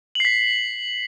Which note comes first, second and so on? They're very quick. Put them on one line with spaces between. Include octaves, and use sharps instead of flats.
F#7 C7 B6